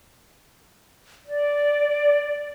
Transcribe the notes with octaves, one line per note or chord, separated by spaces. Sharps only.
D5